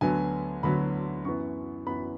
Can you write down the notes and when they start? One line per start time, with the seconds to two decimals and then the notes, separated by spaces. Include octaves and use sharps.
0.01 D2 D3 F#3 B3 G#5
0.63 D2 D3 F#3 B3 B5
1.25 F#2 E3 B3 C#6
1.87 F#2 E3 B3 B5